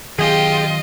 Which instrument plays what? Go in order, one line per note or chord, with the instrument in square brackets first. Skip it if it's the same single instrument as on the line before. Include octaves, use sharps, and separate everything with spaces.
[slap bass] D#3 F#3 B3 [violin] F4 D#5 [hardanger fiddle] G4 G5 [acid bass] G#4